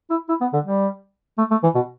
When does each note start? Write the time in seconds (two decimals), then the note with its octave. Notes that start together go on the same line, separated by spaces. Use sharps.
0.10 E4
0.29 E4
0.41 B3
0.53 D3
0.65 G3
1.38 A3
1.51 A3
1.63 E3
1.75 B2